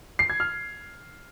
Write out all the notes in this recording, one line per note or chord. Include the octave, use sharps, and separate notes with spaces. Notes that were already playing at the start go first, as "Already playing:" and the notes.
C7
G#6
F6